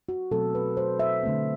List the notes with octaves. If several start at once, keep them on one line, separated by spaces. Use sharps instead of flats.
F#4
B2 F#3 A3 C4 A4
B4
C5
E5
D3 A3 C4